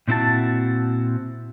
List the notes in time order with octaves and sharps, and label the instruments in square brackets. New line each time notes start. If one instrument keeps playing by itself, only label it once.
[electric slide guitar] A#2 C4 E4 F#4 A5